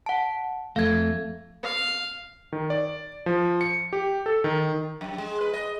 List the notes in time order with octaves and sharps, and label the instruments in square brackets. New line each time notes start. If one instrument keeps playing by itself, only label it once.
[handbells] F#5 A5
[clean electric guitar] F2 A3 [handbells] F5 G#6
[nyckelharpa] F5
[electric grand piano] D#3
D5
F3
C#7
G4
A4
D#3
[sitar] F#2
G#3
B4
D#5